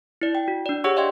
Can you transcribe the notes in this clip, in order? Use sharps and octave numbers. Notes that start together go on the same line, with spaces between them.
E4 D5
G5
F#4
D4 D5
G4 G#4 C#5 F#5 C#6 E6
D5 D#5 F5 G5 C6 G#6